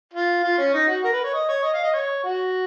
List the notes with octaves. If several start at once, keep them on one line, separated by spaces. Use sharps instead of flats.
F4
F4
C#4
D#4
F#4
A#4
B4
C#5
D#5
C#5
D#5
F5
D#5
C#5
F#4